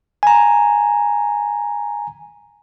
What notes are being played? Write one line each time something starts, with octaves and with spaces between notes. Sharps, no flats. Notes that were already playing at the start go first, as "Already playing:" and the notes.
G#5 A#5